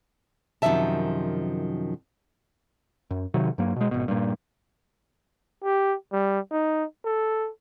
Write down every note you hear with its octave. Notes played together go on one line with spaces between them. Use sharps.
F#2 C3 D#3 F3 E5 A5
F#2
C3 D#3 F#3
G2 F#3 A#3
B2 G#3
G#1 B2
G2 A#2
G4
G3
D#4
A4